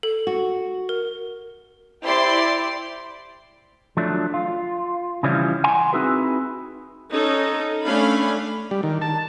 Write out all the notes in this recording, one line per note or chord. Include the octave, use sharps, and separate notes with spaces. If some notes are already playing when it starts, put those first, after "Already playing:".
A4
F#4
A#4
E4 G4 C5 D5 C6
F3 F#3 A3 D4
F4
C#3 E3 F3 G3 C#4 E4
F#5 G#5 C6
C4 D#4 E4 F#4 G#4 B4
C#4 D#4 A4
A3 C#4 D4 F5 B5
G3
D#3
A5